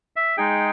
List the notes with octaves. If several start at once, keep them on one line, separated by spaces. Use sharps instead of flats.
E5
G#3 D#4 G#4 G5